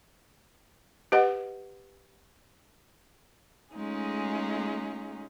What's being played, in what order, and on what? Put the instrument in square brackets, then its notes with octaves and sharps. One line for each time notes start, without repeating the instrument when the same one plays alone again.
[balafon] G4 B4 D#5 F#5
[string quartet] G#3 A3 C#4 D#4 F4 G#4